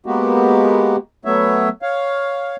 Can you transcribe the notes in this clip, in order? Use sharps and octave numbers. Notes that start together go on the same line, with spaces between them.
G#3 A#3 B3 F#4 G4
F#3 A3 B3 C#5 E5
C#5 F5